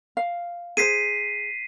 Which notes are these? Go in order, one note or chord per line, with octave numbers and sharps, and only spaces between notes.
F5
G#4 C5 B6 C7 D#7